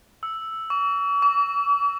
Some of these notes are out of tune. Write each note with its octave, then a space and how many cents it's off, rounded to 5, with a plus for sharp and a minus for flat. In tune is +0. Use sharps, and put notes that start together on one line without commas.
E6 +0
C#6 +45
D6 -45